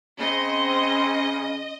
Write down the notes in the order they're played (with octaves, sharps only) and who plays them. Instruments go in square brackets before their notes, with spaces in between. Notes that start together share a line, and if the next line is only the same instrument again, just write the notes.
[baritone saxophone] C#3 [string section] C4 [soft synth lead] C#4 [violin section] D#5